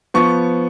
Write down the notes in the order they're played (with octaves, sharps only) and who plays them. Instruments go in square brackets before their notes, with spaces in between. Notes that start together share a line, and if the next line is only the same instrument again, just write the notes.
[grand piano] F3 B3 C#6